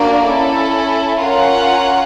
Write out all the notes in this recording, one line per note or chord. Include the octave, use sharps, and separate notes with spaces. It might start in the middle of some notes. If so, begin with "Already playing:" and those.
Already playing: A#3 D4 F#4 A#4 D5
C#4 E4 A4
C#4 F4 A#4 C#5 F#5